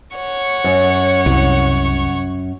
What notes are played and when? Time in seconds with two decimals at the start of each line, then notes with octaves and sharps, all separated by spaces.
0.16 C#5 F#5 C#6
0.64 F#2
1.26 C2